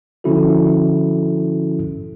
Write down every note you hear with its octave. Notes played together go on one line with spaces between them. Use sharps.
D3 F3 C#4 E4 F#4 A4